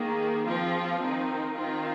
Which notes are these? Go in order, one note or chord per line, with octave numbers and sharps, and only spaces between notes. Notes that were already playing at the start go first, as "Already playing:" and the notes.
Already playing: D#3 A#3 G#4
F3 C4 F4
D#3 C4 D#4
D#3 C4 F4